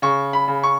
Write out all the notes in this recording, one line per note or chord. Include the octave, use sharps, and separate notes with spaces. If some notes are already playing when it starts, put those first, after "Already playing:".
C#3 C#6
B5
C#3
C#6